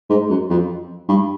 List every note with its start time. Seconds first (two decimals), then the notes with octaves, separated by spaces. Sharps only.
0.10 G#2
0.30 F#2
0.50 F2
1.09 G2